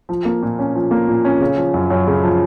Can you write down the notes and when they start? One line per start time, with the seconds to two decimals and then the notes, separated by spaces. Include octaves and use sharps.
0.09 F3
0.25 A#3
0.42 A#2
0.59 C#4
0.75 F3
0.91 A#3
1.08 A#2
1.25 C#4
1.41 C#3
1.57 F3
1.74 F#2
1.90 F#2
2.07 C#3
2.24 F3